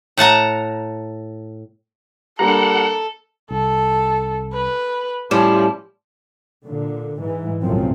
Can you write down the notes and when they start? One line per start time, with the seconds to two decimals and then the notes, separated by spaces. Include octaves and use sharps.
0.17 A2 F#5 A5 A#5
2.39 G3 A#3 D4 A4 F#5 A#5
3.50 C2 A4
4.54 B4
5.31 A2 F3 G3 C#4 E4
6.64 A#2 D3
7.21 G#2 E3
7.60 F1 C2 F#2 A#2 F3 C4